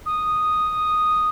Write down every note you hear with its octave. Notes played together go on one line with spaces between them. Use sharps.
D#6